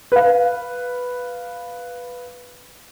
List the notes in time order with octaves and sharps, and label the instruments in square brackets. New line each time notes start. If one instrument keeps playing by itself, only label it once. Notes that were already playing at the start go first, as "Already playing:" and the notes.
[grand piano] B4 F5